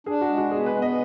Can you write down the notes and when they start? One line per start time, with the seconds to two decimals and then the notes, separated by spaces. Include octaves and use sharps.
0.06 D4 G#4
0.21 F#4
0.29 G#3
0.37 F#4
0.51 B3 G#4
0.66 B4
0.75 B3
0.82 D#5